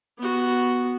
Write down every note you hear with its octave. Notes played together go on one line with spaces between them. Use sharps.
B3 F#4